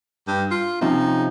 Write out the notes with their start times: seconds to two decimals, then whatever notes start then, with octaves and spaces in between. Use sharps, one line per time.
0.27 G2
0.51 F4
0.81 C3 F3 C#4 D#4